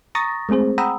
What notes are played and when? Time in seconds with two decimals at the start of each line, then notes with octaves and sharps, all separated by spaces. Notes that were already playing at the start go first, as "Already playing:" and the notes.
0.15 A#5 C#6 D#6 A6 A#6
0.49 G#3 A3 C4 G#4 C5
0.78 F#5 G5 A#5 B5 D#6 E6